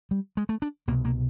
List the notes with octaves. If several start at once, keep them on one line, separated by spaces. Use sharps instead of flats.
G3
G#3
A3
D4
C2 B2 A#3
A#3